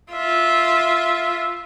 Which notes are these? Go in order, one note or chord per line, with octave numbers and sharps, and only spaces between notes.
F4 E5